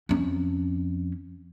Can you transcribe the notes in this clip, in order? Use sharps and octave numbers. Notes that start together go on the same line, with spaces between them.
F2 C#4